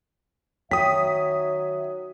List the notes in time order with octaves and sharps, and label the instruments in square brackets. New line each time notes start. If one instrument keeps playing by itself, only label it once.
[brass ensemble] D#3 E5 [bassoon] F#3 [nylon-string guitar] G5 [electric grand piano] D#6 B6